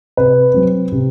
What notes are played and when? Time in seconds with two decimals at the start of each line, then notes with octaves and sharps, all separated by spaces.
0.17 C3 B4
0.54 F#3 C4
0.92 C3